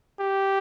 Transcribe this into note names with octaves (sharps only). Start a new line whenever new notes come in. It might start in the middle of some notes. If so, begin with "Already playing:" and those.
G4